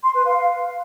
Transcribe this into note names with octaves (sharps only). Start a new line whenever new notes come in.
C6
B4
F5